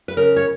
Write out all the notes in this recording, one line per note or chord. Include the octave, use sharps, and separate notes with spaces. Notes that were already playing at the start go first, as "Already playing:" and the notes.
B4
C#3 A#4
C#5